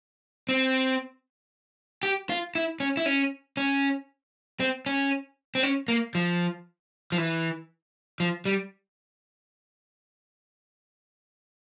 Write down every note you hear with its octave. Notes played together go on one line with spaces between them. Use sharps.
C4
G4
F4
E4
C#4
E4
C#4
C#4
C4
C#4
C4
C#4
A#3
F3
F3
E3
F3
G3